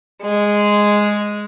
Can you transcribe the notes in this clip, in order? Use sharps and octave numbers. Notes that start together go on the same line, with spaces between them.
G#3